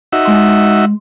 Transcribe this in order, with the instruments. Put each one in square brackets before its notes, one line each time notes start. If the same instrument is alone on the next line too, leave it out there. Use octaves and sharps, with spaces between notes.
[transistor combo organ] D#4 F#4 E5
[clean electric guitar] G#3 C6